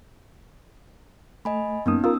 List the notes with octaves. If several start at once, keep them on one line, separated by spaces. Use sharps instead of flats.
A3 D#5 G#5 B5
F#2 A#3 B3 C#4 D#4 D#6
F4 A#4 D#6 E6